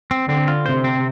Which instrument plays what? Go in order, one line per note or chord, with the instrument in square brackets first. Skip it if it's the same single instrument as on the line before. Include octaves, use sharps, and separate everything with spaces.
[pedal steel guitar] C4
[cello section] D3 [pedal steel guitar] C4
[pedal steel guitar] F4
[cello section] C3 [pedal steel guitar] C5
[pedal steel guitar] C4